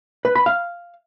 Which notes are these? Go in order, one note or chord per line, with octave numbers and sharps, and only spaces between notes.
B4
B5
F5